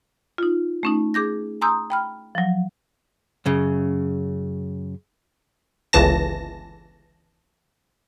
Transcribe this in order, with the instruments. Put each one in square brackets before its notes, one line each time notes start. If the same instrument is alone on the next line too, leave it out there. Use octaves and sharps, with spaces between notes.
[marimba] D#4 F4
A3 C#4 D#4
G#4 D6 G6 A#6
G#5 A#5 C6 D#6 E6 G6
G5 B5 F6
F3 F#3
[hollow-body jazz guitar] F#2 C#3
[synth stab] G1 C#2 C#3 E3 A5 A#6